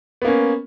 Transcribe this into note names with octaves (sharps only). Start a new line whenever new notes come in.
A#3 B3 C#4